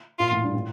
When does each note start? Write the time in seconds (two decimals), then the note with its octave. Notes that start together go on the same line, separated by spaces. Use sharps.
0.19 A#2 F4
0.31 A2
0.43 G2
0.55 A2